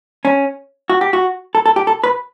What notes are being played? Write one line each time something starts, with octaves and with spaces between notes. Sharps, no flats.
C#4
F#4
G4
F#4
A4
A4
G4
A4
B4